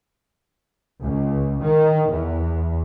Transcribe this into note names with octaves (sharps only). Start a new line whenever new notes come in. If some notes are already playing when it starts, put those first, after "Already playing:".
C#2
D#3
E2